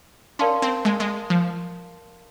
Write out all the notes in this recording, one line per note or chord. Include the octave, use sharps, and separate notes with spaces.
C#4 A#4 D5 F5 A5 C6
C4
G#3
G#3
F3